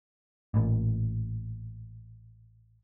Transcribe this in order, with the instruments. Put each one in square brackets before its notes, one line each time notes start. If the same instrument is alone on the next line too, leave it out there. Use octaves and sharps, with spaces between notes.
[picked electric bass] A1 A#2